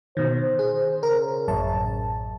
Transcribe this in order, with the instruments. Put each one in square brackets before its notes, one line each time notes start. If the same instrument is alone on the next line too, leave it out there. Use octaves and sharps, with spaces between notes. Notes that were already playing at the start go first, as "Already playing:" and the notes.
[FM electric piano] B2 D#3 [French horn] C5
[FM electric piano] G#4
[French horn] C#3 [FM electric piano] A#4
[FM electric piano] A1 F#2 A5